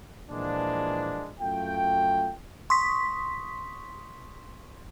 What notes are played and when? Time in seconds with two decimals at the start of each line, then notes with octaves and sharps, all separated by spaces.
0.30 A#2 E3 F3 G#3 A#3 D4
1.40 F#2 A3 F4 G5
2.70 C6 C#6 D#6 B6